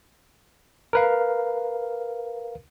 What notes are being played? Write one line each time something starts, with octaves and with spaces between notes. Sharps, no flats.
A#4 B4 F5